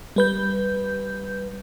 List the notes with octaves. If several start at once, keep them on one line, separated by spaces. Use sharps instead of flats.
G3 B4 G6